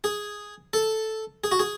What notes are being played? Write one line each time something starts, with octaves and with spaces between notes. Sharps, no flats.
G#4
A4
G#4
F#4
G#4